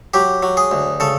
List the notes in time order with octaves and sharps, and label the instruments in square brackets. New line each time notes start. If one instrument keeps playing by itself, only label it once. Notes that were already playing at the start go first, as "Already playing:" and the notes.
[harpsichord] F#3 G4
F#3
G#4
D2
C#3 A4